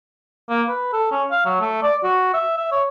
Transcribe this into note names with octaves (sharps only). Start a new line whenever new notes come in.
A#3
B4
A4
C#4
F5
F#3
A3
D5
F#4
E5
E5
C#5